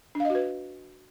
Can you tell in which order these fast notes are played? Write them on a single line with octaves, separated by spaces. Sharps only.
D4 F5 D#5 F#4 B4